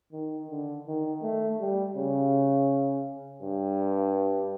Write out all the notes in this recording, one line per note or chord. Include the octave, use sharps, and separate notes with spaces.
D#3
D3
D#3
A3
G3
C#3
G2